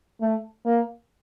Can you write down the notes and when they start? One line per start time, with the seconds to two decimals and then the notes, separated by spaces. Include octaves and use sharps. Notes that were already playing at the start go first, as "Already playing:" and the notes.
0.21 A3
0.65 A#3